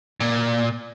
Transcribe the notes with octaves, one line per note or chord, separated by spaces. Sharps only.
A#2